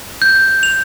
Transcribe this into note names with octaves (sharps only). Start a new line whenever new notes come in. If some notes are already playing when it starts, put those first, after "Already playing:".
G6
F7